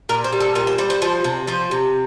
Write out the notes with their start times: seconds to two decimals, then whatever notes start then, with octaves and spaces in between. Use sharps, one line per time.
0.09 A#2 A#4
0.24 C5
0.33 G3
0.40 A4
0.55 A#2 A#4
0.67 C5
0.78 G3 C5
0.90 C5
1.02 F3 C5
1.24 C3
1.47 F3 C5
1.71 C3